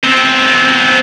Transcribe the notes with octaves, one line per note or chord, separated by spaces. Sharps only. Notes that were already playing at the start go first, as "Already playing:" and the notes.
B3 C4